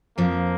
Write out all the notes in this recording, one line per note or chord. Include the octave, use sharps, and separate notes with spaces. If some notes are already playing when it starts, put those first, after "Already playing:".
F2 F3 A#3